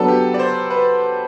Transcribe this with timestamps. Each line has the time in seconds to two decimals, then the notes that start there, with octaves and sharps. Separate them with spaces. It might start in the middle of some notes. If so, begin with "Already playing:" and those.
Already playing: F#3 B3 D4 A4 B4
0.08 G4
0.34 D5
0.39 C5
0.70 B4